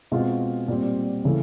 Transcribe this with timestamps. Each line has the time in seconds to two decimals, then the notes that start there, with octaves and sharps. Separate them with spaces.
0.12 B2 G#3 C4 F4
0.68 A#2 G3 C4
1.25 C#3 E3 A3